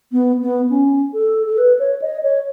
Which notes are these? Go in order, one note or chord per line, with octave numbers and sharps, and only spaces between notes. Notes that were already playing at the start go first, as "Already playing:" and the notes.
B3
B3
C#4
A4
A4
B4
C#5
D#5
C#5